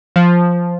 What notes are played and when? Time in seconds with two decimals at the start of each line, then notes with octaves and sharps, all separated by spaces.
0.16 F3